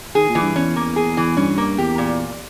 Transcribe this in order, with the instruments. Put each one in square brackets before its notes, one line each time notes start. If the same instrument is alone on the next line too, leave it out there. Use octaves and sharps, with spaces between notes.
[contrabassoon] D#3 [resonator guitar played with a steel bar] G#4
[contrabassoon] A#2
[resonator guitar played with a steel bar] E3
[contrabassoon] G2
[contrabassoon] E2 [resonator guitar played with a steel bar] C#4
[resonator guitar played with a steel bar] A#3
G#4
E3
[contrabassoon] G2 [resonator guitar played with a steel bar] C#4
[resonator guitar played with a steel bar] A#3
[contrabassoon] E2 [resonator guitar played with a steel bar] G4
[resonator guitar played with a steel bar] A#2